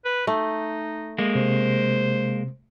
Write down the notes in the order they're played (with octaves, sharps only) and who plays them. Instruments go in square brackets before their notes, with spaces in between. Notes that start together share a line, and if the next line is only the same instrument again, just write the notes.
[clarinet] B4
[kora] A3 [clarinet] D#4
[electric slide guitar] G#3 A#3
[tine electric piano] C3 [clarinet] C5